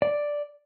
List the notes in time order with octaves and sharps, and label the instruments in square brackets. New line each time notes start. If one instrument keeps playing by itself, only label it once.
[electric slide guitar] D5